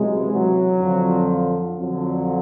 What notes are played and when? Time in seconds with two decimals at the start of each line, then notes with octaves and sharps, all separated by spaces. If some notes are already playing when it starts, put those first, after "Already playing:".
Already playing: C#2 C3 E3 F#3 G#3
0.30 F#3
0.79 F2 D3 F3
1.78 F2 D3 F3 F#3